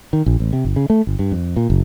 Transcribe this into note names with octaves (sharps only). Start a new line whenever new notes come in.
D#3
A#1
A1
C3
G1
C#3
A3
G1
G2
F2
A#2
F#1